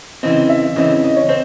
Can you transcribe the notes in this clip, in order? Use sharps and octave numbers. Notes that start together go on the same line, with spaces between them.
C#3 E3 C4 D#5
E5
C#3 E3 C4 D#5
D#5
C#5
C4 C5